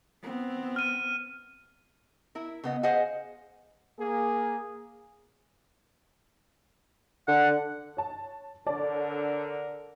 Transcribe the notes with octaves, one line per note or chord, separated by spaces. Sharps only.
B3 C4
F6 D#7
E4 A#4
C#3 B3 D#5
G#4 C5 D#5 F5 F#5 G#5
A#3 G#4
D3 F#5
C#5 A5
D3 A#4 C#5 D5 A5